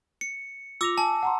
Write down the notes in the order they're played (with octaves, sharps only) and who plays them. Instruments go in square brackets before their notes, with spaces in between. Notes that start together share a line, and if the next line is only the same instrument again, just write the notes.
[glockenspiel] C#7
[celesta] F4 A#6 F7 [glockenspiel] D6 E6
[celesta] G#5 [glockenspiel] A5
[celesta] F#5 A#5 C6